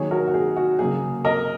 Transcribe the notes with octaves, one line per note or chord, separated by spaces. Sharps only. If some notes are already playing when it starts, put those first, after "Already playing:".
Already playing: D#3 F#3 A#3 D#4 G#4 C#5
F#4 A#4
F#4
G#4
F#4
C#3 F#3 A#3 G#4
A#4 D#5